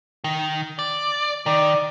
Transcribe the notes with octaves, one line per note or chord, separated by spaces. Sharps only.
D#3
D5
D#3 D5